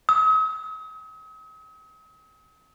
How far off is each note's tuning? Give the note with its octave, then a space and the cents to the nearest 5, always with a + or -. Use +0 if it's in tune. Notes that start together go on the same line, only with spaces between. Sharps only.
D#6 +45